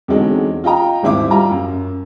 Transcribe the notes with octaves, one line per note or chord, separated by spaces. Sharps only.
E2 D3 F#3 G#3 C4 D#4
F4 D#5 G5 A#5
D#1 G#1 G#2 E4 E5 D6
G3 F4 A#5
F#2